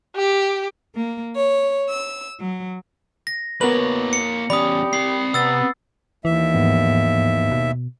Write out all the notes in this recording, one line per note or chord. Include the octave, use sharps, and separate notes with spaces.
G4
A#3
C#5
E6
F#3
A#6
B2 A#3 B3 A#4 B4 C#5 F#7
C#7
E2 C#4 G4 D5 B5 D#6
C4 B5 C7
C3 B3 E6 A6
D#2 E3 E5
G#2 F3 B3
B2